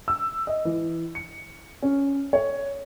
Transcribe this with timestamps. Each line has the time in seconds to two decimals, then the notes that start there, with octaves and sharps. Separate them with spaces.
0.08 E6
0.47 D#5
0.65 E3
1.15 C#7
1.82 C#4
2.33 C#5